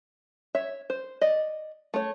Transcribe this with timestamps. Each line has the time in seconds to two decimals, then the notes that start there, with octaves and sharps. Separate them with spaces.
0.55 C#5 E5
0.90 C5
1.21 D5 D#5
1.94 A3 C#5